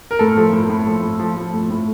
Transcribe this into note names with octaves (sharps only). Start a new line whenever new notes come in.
A#4
A2 A4
F3
A2
A2
F3
A2
F3
F3
A2
A2